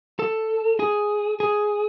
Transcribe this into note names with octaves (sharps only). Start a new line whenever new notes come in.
A4
G#4
G#4